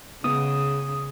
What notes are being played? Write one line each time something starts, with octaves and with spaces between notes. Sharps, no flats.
C#3 G#3 B3 E4 D#6